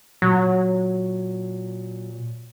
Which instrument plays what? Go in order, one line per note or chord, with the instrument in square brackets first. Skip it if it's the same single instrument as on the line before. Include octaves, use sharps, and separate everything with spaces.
[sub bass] A#2 [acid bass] F#3